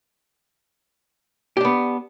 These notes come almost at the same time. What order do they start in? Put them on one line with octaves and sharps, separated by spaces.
G4 D4 B3